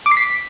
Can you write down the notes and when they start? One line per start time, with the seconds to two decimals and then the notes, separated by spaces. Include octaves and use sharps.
0.06 D6
0.11 C7
0.17 B6